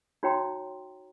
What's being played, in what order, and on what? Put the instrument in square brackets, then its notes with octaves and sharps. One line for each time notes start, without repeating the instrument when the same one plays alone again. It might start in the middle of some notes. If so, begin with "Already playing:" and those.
[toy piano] D#4 F#4 C#5 G5 A#5 C6